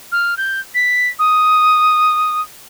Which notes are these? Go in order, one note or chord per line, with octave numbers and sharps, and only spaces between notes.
F6
G6
B6
D#6